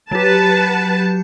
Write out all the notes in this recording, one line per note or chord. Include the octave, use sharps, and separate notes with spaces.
F#3 G4 B4 A5